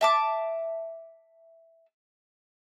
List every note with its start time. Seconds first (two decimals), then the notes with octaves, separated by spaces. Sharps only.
0.01 E5 A5 D6